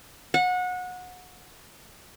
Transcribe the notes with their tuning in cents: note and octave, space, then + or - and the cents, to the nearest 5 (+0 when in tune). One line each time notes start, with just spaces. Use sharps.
F#5 -25